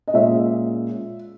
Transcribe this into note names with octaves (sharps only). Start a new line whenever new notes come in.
D#5
A#2 G#3 C#4 E5